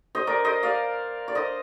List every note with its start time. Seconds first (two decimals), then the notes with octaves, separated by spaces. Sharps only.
0.15 C5 D#5
0.27 A#4 D5
0.44 C5 D#5
0.63 D5 F5
1.28 D5
1.35 C5 D#5